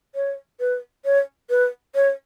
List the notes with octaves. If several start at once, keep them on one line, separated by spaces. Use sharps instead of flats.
C#5
B4
C#5
B4
C#5